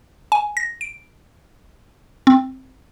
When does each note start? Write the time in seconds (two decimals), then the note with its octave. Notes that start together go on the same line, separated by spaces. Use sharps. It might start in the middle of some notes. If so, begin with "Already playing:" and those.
0.32 G#5
0.57 A#6
0.81 D7
2.27 C4